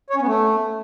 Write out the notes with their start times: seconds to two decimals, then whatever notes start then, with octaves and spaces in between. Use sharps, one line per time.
0.10 C#5
0.16 C#4
0.21 B3
0.27 A3